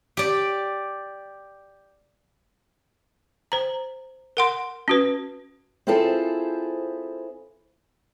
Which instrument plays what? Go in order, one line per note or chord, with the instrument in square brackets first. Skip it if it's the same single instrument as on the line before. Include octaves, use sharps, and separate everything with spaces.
[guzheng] G4 D5
[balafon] C5 A#5
A#4 F#5 C6
C#4 F#4 B4
[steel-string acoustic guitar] C4 E4 F4 G#4 A4 C5